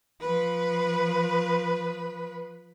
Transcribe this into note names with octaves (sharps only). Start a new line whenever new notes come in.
F3 B4